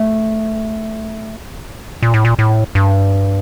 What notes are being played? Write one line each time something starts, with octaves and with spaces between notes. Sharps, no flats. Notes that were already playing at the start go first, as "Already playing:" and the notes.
Already playing: A3
A#2
A2
A#2
A2
G2